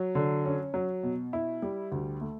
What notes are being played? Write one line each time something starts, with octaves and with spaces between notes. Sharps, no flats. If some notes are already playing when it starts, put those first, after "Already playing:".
Already playing: F#3
D3
C#4
F#3
B2
E4
G3
D2
A3